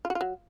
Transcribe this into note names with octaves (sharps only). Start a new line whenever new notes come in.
F4
F#4
F4
F#3